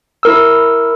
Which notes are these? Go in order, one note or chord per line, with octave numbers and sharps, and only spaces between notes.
E4 A#4 E6